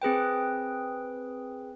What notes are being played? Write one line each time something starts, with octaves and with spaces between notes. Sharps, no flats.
C4 G#4 B4 G5